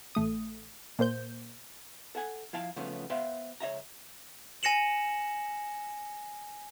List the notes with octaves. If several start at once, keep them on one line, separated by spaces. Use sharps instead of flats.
A1 A3 D#6
A#2 A#3 C5 G6
A4 F#5 G#5
F3 E4 F5 G5 A5
C#3 F3 A3 B3 C#4
B3 C5 E5 F5 G5
C#2 C#5 D#5 E5 A#5
G#5 A#6 C#7 E7 F#7